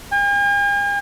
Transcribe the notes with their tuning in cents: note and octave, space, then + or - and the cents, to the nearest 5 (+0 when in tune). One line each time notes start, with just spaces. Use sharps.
G#5 -45